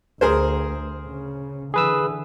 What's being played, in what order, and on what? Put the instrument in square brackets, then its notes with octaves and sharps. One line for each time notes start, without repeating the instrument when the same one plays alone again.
[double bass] D2 [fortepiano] G#4 A#4 C5
[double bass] C#3
[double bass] D3 E3 [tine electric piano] G#4 B4 E6